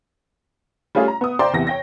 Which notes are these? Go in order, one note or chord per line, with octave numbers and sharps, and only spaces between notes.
G3 A3 C#4 F4 G#4
A#5
B3 D#6
C5 D5 G5 A#5 C6 D6
E2 C3 A#6
C#5 G5 A#6